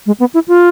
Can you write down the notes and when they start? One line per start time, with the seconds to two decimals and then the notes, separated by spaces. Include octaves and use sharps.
0.06 G#3
0.20 B3
0.34 E4
0.48 F4